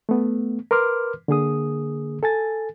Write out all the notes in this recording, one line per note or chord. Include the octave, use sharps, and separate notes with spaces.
A3 B3
A#4 B4 C6 D6 F6
D3 A#3 G#4 D#6
A4 G#5 A6